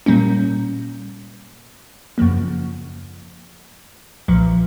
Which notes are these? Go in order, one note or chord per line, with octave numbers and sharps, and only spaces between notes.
A#2 G3 A#3 C#4
F#2 C#3 F3 A#3
B1 A#2 F3